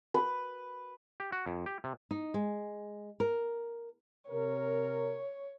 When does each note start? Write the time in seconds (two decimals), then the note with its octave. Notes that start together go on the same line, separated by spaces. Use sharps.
0.14 B4
1.20 G4
1.32 F#4
1.46 F2
1.66 G4
1.84 C3
2.11 D#4
2.34 G#3
3.20 A#4
4.30 C3 A#4 C#5